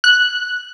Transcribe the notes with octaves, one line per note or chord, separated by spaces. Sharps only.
F#6